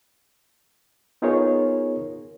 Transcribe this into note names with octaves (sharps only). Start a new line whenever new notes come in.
B3 D#4 F4 G#4 A#4 C#5